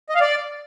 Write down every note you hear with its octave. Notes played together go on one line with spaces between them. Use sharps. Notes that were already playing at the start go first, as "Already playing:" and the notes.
D#5
F5
D5